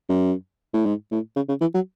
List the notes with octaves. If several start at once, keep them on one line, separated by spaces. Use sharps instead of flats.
F#2
A2
G#2
A2
C#3
C#3
E3
F#3